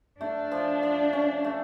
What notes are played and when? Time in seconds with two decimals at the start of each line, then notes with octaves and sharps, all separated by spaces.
0.20 A3 D4
0.51 F3
0.83 F3
1.13 C#4
1.44 A3